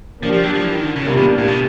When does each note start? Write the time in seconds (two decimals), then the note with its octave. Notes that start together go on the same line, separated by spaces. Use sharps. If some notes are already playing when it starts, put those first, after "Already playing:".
0.23 F3 A#3 D4 G4
0.33 F3
0.43 F#3
0.54 F3
0.65 E3
0.75 D#3
0.85 D3
0.96 C#3
1.06 C3 E3 G3 A#3 D4 F4
1.17 B2
1.38 A2
1.48 B2